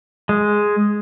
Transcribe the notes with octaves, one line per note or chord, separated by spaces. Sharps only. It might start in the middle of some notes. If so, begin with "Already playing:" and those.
G#3